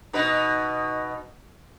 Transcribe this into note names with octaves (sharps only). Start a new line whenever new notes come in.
B2 D#4 B4